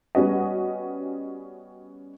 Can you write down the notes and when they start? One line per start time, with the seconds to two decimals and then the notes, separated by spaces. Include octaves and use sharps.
0.15 G3 B3 C#4 F#4 D#5